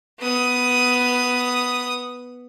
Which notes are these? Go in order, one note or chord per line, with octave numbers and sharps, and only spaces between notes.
B3 D#6